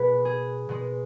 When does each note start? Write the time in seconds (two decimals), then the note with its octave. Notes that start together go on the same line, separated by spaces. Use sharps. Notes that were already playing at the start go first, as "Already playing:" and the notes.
Already playing: B2 G#3 B4
0.25 G#4
0.69 B2 G#3